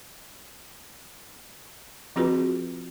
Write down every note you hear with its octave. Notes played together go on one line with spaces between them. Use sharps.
F3 C4 F4 F#4 G#4 B4